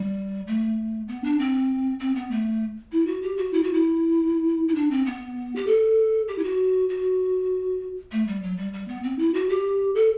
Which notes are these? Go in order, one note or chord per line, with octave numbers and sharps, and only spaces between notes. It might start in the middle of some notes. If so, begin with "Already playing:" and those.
Already playing: G3
A3
B3
D4
C4
C4
B3
A3
E4
F#4
G4
F#4
E4
F#4
E4
E4
D4
C4
B3
G4
A4
G4
E4
F#4
F#4
A3
G3
F#3
G3
G3
B3
C4
E4
F#4
G4
A4